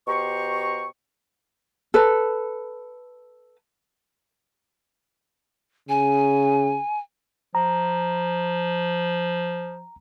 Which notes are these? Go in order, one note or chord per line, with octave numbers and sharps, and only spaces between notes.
B2 G4 C5 A#5 C#6
A4 B4
C#3 G#5
F3 A#5